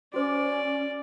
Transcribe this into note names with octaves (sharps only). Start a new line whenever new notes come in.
C#4 F#4 C5 D5 D6